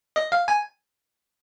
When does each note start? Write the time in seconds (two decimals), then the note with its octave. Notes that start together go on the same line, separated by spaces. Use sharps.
0.16 D#5
0.32 F5
0.48 G#5